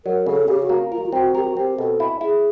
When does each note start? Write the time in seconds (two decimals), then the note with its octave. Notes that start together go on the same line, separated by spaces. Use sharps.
0.05 F#3 A#4
0.26 C#3 A4
0.48 C#3 G4
0.62 F#4
0.69 A#3
0.91 F4 A#4
0.99 F#4
1.06 F4
1.12 C4 F#4
1.35 G4 A#4
1.45 F#4
1.56 C4 G4
1.77 B2 A4
2.00 E4
2.21 E4 G#4